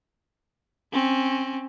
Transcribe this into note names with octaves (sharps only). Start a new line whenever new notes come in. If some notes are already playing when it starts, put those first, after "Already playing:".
C4 C#4